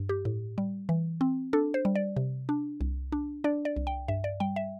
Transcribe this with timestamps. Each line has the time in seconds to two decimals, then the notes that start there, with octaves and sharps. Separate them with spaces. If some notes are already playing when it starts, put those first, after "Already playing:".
Already playing: G2
0.09 G4
0.25 A2
0.58 G3
0.89 E3
1.21 C4
1.53 D4 A4
1.74 C5
1.85 G3
1.95 D5
2.16 C3
2.49 D4
2.81 C2
3.12 D4
3.44 D4 D5
3.65 D5
3.76 C2
3.87 G5
4.08 G2 E5
4.24 D5
4.40 G3 G5
4.56 E5